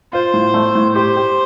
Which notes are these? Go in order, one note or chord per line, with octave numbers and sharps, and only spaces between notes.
F4 C5
A2
A3
A2
G4 C5
G4